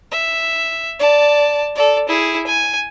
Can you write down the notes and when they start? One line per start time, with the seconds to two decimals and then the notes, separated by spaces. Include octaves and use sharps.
0.11 E5
0.99 D5 A5
1.75 A4 D5
2.08 E4 G#4
2.47 G#5